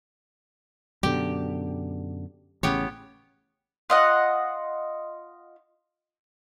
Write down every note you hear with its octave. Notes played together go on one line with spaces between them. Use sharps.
F#2 B2 D3 G4
A1 C#3 B3 G4 C#5
F4 D#5 F#5